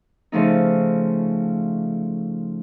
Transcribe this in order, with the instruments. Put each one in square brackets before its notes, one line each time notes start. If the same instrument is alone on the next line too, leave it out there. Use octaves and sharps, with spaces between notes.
[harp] C#3 F3 A3 D#4